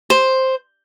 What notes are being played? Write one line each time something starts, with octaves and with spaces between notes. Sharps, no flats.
C5